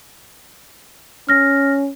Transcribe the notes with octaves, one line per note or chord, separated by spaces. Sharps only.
C#4 F6 A#6